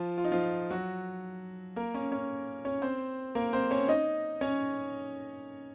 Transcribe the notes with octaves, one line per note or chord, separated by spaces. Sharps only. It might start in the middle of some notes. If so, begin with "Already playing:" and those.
Already playing: F3 F4
F4
D#4
F3 F4
F#3 F#4
A#3 A#4
C#4 C#5
C#4 C#5
C#4 C#5
C4 C5
A#3 A#4
C4 C5
C#4 C#5
D#4 D#5
C#4 C#5